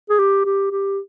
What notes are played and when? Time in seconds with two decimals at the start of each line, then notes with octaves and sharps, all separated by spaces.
0.10 G#4
0.19 G4
0.45 G4
0.71 G4